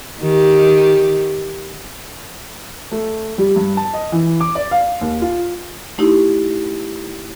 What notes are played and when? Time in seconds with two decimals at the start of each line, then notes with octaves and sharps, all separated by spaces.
0.21 D#3 G4
2.91 A3
3.38 G3
3.56 G2
3.77 A5
3.93 D#5
4.12 E3
4.41 D6
4.55 D5
4.71 F5
5.01 D#2
5.22 F4
5.98 A3 D#4 E4 G4